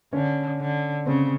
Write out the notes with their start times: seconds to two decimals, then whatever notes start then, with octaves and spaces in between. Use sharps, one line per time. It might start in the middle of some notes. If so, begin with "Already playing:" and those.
0.13 D3 C#4
0.60 D3
1.06 C#3 C4